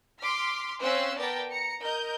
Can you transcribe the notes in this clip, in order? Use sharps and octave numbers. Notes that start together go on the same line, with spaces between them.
C6 D6 F6 B6
C4 C#4 C5 F5 E6 F#6
B3 A#4 D5 G5 A5 A#5
A#5 C#7
A#4 D#5 G6